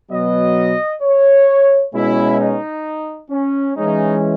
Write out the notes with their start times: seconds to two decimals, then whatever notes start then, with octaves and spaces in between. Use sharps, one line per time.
0.11 B2 F#3 B3 D#5
1.03 C#5
1.94 B2 G#3 C#4 E4
2.39 D#4
3.31 C#4
3.76 E3 G#3 C#4 D#4